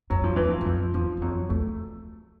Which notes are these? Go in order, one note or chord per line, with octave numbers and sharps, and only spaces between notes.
F2 F#3
F3
E2 E3
F3
F#2
F2
E2 F3
F#2
F2 F#3
E2 A3